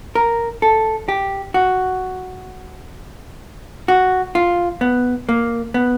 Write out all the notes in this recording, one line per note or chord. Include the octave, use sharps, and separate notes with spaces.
A#4
A4
G4
F#4
F#4
F4
B3
A#3
B3